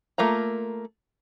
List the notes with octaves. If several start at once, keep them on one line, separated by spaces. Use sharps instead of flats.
A3 A#3 F4 A#5